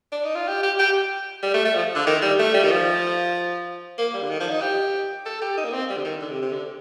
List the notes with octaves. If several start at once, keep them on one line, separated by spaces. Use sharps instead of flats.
D4
D#4
F4
G4
G4
G4
G3
A3
A3
F3
D3
D#3
G3
A3
G3
D#3
F3
A#3
G3
D3
D#3
F3
D#4
G4
A4
G4
D#4
A#3
C4
G3
D3
D#3
D3
C3
C3
D3